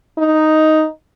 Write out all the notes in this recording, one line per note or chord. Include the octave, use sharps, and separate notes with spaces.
D#4